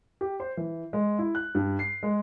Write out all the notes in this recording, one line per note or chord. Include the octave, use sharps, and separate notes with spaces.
G4
C5
E3
G#3
E4
F#6
G2
C7
G#3